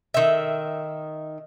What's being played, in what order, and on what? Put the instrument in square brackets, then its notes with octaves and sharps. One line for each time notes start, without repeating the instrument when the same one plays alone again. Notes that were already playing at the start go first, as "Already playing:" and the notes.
[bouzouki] D#3 E5